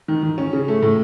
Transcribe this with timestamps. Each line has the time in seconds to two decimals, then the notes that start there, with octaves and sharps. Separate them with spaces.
0.08 D#3
0.23 D#3
0.38 C#4
0.53 C#3
0.68 A3
0.82 A2